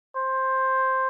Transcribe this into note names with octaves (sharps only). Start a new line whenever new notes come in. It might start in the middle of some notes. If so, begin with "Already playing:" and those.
C5